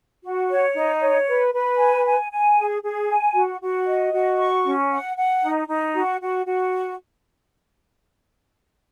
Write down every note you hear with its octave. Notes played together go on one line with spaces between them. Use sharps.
F#4
C#5
D#4
C#5
B4
B4
G#5
G#5
G#5
G#4
G#4
G#5
F#4
F#4
D#5
F#4
C#6
C#4
F#5
F#5
D#4
D#4
F#4
F#4
F#4